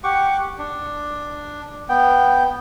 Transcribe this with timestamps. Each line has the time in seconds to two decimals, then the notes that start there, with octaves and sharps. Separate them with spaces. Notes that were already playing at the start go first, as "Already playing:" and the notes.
0.04 G4 F#5 C#6 D6
0.59 D4
1.89 B3 G5